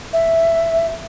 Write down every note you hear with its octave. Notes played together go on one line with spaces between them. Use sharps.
E5